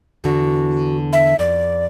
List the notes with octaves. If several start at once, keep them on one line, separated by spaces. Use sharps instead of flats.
E2 D3 F#4
E5
F2 D5